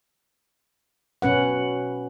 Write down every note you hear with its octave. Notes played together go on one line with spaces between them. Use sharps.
B2 C#4 B4 F#5